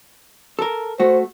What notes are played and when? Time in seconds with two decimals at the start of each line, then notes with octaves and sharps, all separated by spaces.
0.59 A4 A#4
1.00 A3 F#4 C5